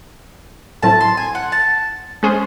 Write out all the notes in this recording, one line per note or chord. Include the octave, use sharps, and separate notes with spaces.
A2 F#3 C4 E4 A5
C6
G#5
F#5
A5
G#3 C#4 G#4 C5